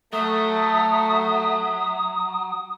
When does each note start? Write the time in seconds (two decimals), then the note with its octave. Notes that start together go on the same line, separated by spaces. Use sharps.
0.13 F#3 A3 E5 D#6